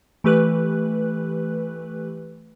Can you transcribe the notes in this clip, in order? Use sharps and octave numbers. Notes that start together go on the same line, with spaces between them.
E3 A3 G4 B4 F#6